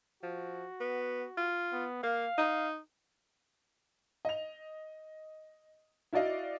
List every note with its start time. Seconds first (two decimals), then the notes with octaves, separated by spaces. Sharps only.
0.23 F3 F#4
0.80 B3
1.37 F4
1.73 B3
2.03 A#3 F5
2.38 D#4
4.25 D#5 F7
6.13 E4 F#4 D5 D#5 F5